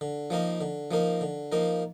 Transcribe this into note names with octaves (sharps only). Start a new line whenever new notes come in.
D3
F3 A#3 D#4 A#4
D3
F3 A#3 D#4 A#4
D3
F3 A#3 D#4 A#4